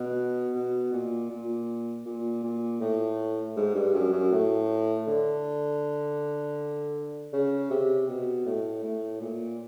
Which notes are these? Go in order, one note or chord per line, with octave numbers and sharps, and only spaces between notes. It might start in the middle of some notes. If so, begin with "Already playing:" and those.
Already playing: B2
B2
A#2
A#2
A#2
A#2
A2
G#2
G2
F#2
F#2
A2
D3
C#3
C3
B2
A2
A2
A#2